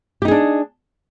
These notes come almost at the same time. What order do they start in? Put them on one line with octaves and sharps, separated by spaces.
G4 D#4 G#4 D4